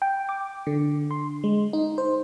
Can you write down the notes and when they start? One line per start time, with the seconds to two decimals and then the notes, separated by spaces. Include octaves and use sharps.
0.02 G5
0.29 D6
0.67 D3
1.11 C6
1.44 G#3
1.73 D#4
1.98 C5